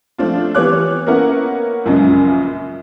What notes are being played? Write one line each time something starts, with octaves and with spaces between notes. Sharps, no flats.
F3 A3 C4 D4 F4
E3 B3 G4 C#5 D6 F#6
A#3 B3 C#4 E4 A#4 F#5
A#1 F#2 C#3 G#3